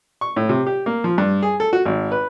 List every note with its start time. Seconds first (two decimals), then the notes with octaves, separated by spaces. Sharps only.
0.21 C#6
0.36 A2
0.49 C3
0.66 G4
0.86 A#3
1.04 F3
1.18 G2
1.42 G#4
1.60 A4
1.73 F#4
1.85 G#1
2.12 B4